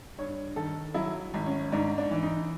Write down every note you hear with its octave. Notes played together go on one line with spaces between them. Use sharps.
G2 C#5
D#3 A4
F#3 E4
G#1
C#4
G#2 D4
D4
E3
D#4